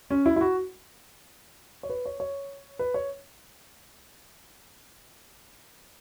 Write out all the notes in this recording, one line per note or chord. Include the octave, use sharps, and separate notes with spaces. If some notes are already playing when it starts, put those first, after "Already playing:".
C#4
E4
E4
F#4
C#5
B4
C#5
C#5
B4
C#5